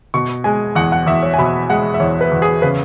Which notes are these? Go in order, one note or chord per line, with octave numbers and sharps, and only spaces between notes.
B2 C#6
G#3 G#5
E2 F#5
F#5
E2 E5
C#5
G#5
B2 B5
G#3 F#5
E5
E2 C#5
B4
E2
G#4
C#3 B4